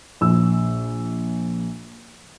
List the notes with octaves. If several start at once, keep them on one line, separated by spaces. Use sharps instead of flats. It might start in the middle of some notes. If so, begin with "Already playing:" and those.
A#1 E6